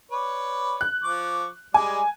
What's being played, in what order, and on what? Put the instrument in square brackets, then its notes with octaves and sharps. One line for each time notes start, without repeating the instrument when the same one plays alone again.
[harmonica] B4 C#5 D5
[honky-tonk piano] F#6
[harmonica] F3 C#6 D6
[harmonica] G3 G#3 D5 [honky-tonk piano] G#5